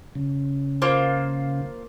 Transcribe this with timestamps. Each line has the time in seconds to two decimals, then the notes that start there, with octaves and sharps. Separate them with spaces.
0.15 C#3
0.82 A#3 F4 C5